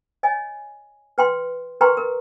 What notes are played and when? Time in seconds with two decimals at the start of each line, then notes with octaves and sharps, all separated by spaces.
0.23 C#5 D#5 G#5
1.18 B4 G5 C6
1.81 A#4 B4 G5 A#5 C6 C#6
1.97 A#4